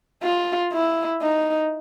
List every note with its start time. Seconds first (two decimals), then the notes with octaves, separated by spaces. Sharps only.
0.23 F4
0.73 E4
1.22 D#4